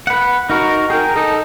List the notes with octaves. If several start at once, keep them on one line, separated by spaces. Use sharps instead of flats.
B4 F#5
D#4 F#4 A#4
G#4 A#4 G5
D#4 A4